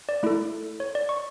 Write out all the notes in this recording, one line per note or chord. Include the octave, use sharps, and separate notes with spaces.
D5
A3 E4 A4
C#5
D5
C#6